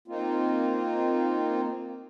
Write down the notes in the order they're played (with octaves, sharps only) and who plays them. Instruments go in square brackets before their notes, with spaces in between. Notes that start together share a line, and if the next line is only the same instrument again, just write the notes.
[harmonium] A#3 C4 D#4 F4